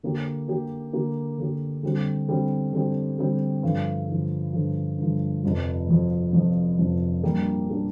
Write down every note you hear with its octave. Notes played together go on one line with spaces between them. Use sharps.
D3 A#3 G4
D3 A#3 G4
D3 A#3 G4
D3 A#3 G4
D3 G3 C4 G4
D3 G3 C4 G4
D3 G3 C4 G4
D3 G3 C4 G4
G2 D3 F3
G2 D3 F3
G2 D3 F3
G2 D3 F3
F1 F2 F3
F1 F2 F3
F1 F2 F3
F1 F2 F3
A#1 A#2 G3 A#3 D4
A#2 G3 A#3 D4